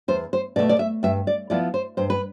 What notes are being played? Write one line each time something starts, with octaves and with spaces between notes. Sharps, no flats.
E2 C5
C5
B2 A3 D5
D5
E5
G2 E5
D5
F3 B3 E4 D5
C5
G2 C5
B4